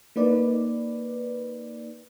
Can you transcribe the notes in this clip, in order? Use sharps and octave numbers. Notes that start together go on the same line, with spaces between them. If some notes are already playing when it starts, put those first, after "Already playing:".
A#3 D#4 B4 D5